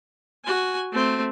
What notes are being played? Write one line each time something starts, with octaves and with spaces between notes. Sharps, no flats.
F#4 G#5
A3 C4